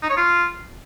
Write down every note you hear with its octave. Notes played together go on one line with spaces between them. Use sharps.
D#4
C#5
F4